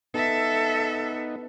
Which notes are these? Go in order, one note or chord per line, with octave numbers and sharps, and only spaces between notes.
B3 D#4 A4 E5